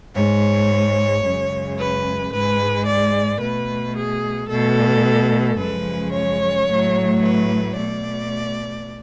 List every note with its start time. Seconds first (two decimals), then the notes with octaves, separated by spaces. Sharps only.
0.15 G#2 G#3 C#5
1.24 F#2 C#3 G#3
1.79 B4
2.33 G#2 G#3 B4
2.86 D5
3.41 B2 A3 B4
3.96 G#4
4.50 B2 A3 A4
5.58 F#2 C#3 F3 G#3 B4
6.13 C#5
6.68 A2 F#3 A3
7.21 B4
7.75 B2 A3 D5